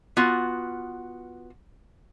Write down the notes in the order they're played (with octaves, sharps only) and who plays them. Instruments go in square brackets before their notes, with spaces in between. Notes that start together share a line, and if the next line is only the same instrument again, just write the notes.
[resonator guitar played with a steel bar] B3 F4 F#4